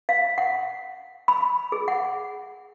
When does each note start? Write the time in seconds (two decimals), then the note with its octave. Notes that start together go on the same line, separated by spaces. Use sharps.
0.09 F5
0.38 F#5
1.28 B5
1.72 G#4
1.88 F#5